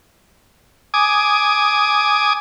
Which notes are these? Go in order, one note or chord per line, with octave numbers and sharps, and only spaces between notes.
G#5 D6 D#6